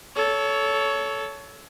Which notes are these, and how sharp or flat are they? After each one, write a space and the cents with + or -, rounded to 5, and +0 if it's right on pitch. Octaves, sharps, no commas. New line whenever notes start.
A4 -10 C#5 +20